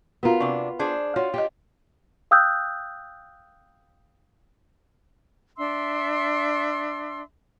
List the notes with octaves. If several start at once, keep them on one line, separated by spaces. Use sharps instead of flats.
B3 F4 F#4 A#4 A#5
C3 D4 C#6
D4 G#4 C5 A5
F4 F#4 C#5
G4 D#5 G5
F5 G5 D#6 E6 F#6 G6
D4 E5 C6 E6